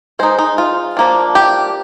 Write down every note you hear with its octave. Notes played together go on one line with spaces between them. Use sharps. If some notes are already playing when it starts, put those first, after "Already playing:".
G#3 D#4 C5
D#4
F4
F3 A#3 D4
G4